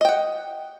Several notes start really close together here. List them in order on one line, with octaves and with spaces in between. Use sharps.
D#5 G5 F#5